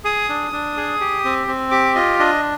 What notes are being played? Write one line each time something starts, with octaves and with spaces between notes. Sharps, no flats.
G#4 D#6
D4
D4
G#4
G4
C4
C4
G4 D6
F4 D#5
D4 D#5